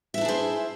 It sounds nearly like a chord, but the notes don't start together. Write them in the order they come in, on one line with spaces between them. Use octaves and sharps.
E5 E4 D4 G#4 C5